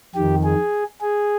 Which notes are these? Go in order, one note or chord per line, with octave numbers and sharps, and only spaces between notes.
F2 D#3 G4
G#4
G#4